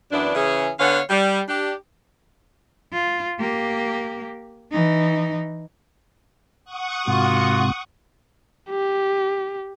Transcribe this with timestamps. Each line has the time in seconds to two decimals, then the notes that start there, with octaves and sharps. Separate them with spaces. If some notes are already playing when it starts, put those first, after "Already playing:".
0.12 F#2 E3 B3 D4
0.35 C#3 E3 C#4 G#4
0.80 D3 B3 C#5 F5 F#5
1.10 G3
1.49 D4 G4
2.92 F4
3.39 A#3 G4
4.72 E3 D#4
6.65 F#5 C#6 D#6
7.07 G#2 C3 A#3 F4 F#4
8.70 G4